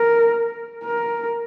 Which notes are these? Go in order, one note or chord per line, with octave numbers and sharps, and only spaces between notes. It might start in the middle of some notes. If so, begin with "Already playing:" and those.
Already playing: A#4
A#4